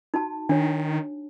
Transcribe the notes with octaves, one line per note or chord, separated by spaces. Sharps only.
D#4 F#4 A5
D#3 D4 C#5